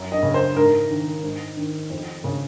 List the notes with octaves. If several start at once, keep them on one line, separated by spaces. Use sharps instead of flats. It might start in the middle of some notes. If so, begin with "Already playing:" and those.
Already playing: F#2
D#5
C#3
C5
G#2 A#4
D#3
G#2
D#3
F2
C#3